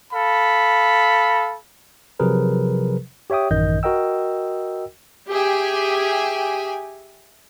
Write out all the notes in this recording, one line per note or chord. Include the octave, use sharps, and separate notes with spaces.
A4 F5 B5
C3 F3 F#3 G#4 A#4 B4
G4 C#5 E5 G5 D#6
A1 F#2 D#3 D#5 G6
F#4 A#4 D#5 G5 E6
G4 G#4 E5 G5 G#5